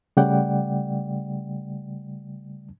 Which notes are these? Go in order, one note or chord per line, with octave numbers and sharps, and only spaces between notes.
C#3 G3 A3 D5 F#5 G5